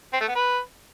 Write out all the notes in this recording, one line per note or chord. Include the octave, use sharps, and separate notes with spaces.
C4
A3
B3
B4